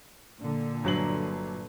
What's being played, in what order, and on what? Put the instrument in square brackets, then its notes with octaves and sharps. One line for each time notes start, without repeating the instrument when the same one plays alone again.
[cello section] A#2 D3
[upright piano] G1 F#3 F#7